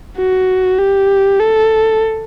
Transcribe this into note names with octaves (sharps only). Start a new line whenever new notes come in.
F#4
G4
A4